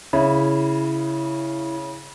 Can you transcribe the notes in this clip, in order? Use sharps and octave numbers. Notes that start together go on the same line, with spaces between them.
C#3 E4